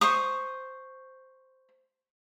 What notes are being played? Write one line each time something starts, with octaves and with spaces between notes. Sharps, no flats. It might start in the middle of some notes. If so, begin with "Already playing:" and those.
C5 C#6 D#6